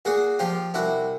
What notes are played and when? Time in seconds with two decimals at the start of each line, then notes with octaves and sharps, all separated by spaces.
0.05 A#2 F#4 G#4
0.39 F3 F4 G4
0.74 C2 E4 F#4